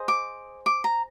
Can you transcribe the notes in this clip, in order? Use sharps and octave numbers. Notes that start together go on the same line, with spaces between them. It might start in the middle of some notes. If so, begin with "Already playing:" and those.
Already playing: G#4 C5 D#5
D6
D6
A#5